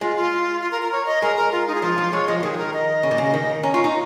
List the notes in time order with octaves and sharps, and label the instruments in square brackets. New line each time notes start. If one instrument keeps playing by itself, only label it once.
[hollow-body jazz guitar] G#3 [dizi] F4
[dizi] F4
F4
A#4
A#4
C#5
D#5
[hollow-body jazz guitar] G#3 [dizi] A#4
[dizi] A#4
F4
D#4
G#4
[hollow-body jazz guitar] F3 [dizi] F4
[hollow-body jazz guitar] F3
[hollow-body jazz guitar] G#3 [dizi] C#5
[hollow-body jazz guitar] F3 [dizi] D#5
[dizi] F4
[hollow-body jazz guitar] D#3 [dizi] G#4
[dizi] G#4
A#4
D#5
[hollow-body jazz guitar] C#3
A#2
C#3
D#3
[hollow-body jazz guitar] C#4 [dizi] A#5
[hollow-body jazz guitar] F4 [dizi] C#6
[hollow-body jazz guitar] D#4 [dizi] A#5